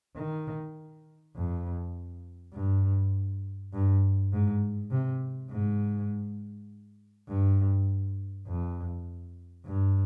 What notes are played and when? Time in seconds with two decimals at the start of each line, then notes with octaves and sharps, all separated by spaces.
0.16 D#3
1.35 F2
2.53 G2
3.73 G2
4.32 G#2
4.91 C3
5.51 G#2
7.28 G2
8.47 F2
9.66 G2